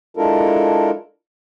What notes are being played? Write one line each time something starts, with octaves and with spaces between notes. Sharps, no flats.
G#3 D4 E4 F4 A4 A#4